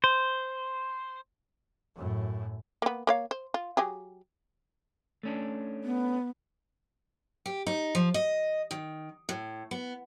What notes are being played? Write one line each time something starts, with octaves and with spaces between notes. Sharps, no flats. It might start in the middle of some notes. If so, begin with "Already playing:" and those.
C5
F#2 A2
A#3 B3
A#3 C#5 F5
C5
F4
F#3 G4 G#4
A3 C#4 D4
B3
G4
D#4
F3
D#5
D#3
A2
B3